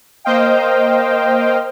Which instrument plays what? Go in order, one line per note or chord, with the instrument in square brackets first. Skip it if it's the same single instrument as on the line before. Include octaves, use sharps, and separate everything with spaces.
[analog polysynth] A#3 C5 D#5 F5 G5